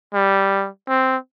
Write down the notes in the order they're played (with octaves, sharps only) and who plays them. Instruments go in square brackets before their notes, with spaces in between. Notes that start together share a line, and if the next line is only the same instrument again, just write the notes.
[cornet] G3
C4